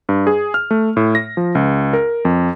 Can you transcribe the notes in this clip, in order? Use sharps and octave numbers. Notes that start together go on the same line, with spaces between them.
G2
G#4
F6
A3
A2
A#6
F3
C#2
A#4
F2